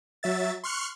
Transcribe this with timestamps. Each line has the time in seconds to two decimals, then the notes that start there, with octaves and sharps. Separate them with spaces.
0.23 F#3 E5 A6
0.64 C6 C#6 F6 F#6 C#7